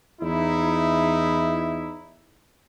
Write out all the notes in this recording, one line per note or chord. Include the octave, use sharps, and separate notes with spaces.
E2 D#4 E4